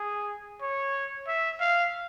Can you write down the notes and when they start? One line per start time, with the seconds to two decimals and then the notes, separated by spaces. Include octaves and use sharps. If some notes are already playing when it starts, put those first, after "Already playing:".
Already playing: G#4
0.61 C#5
1.27 E5
1.60 F5